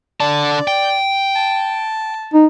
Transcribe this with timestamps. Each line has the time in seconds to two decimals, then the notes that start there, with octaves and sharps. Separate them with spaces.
0.20 D3 D5 A5
0.68 G5
1.36 A5
2.34 D#4